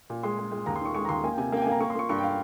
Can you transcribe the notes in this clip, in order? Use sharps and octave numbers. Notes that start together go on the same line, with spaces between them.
A#2
G#3 C6
G#3
G#3
D#2 A#5
C6
D#3 C#6
G#3 C#6
A#5
D#2 C6
A#3 G#5
G5
C3 G#5
A#3 G5
G#5
A#3 A#5
A#3 C#6
C6
A#3 C#6
G2 C#6
G5
F5